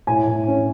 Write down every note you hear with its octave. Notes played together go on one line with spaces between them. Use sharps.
A2 G#5
A2
C#4